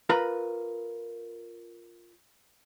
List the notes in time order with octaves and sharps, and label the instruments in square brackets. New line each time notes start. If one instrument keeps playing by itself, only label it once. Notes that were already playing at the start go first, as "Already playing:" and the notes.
[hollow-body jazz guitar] F4 A#4 B4 A#5 B5